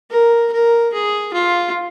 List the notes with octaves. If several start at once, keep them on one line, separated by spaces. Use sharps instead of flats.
A#4
A#4
G#4
F4